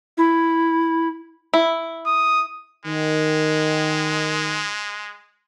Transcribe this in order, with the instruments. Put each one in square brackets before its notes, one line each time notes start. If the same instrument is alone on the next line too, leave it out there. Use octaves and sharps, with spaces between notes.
[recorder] E4
[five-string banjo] E4
[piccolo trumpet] D#6
[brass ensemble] D#3 [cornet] G#3